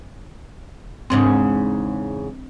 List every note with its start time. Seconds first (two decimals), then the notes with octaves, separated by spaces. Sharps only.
1.10 E2 G#2 C#3 C4 D4